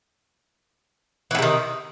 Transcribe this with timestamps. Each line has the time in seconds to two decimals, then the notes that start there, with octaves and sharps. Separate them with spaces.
1.31 E3
1.35 A2
1.39 C3
1.42 D#3